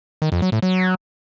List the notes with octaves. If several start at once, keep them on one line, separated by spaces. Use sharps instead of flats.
D#3
F2
F#3
A2
F#3